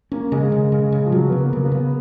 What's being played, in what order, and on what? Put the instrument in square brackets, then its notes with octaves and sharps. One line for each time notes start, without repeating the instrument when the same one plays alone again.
[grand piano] A#3 [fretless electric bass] C#4
[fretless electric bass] C#3 [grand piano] G#3
[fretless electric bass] C#3
C#3
C#3
[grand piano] F3
[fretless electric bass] C#3 [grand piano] F#3
[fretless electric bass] C#3 [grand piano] B3
[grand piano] A#3
[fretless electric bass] C#3 [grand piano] A#3
[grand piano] B3
[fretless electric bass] C#3